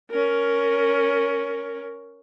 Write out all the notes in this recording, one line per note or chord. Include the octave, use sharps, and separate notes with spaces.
C#4 A#4